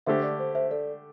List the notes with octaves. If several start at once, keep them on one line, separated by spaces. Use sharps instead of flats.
D3 A3 D4 G4 C5 E5
A4 D5
C5
C5 E5
A4 D5